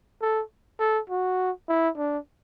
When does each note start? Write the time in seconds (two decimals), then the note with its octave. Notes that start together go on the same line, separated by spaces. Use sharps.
0.21 A4
0.79 A4
1.10 F#4
1.68 E4
1.97 D4